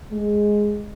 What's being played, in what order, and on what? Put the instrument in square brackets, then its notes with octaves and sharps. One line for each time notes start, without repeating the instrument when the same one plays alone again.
[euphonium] G#3